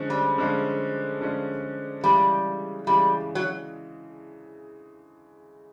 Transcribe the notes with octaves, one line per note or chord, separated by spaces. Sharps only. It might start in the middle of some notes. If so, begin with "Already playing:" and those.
Already playing: D3 F3 G#3 C#4
G3
D3 F3 G#3 C#4
D3 F3 G#3 C#4
C#3 E3 G3 G#3
C#3 E3 G3 G#3
F#3